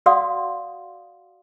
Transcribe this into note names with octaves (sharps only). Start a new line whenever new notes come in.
F#4 D5 F5 F#5 C6 D#6